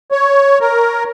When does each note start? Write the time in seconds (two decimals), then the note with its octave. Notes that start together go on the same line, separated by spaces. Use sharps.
0.12 C#5
0.61 A#4